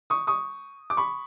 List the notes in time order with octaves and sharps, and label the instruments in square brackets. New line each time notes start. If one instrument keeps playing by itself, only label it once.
[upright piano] C#6 D#6
C#6 D#6
D6
B5 C#6